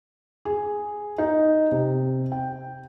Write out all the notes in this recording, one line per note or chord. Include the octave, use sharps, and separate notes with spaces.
G#4
D#4
C3
G5